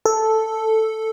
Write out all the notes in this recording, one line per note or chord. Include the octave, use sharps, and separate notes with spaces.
A4